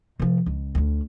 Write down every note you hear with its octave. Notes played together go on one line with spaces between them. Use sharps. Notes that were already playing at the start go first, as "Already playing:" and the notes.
C3 F3
C#2
D2 D3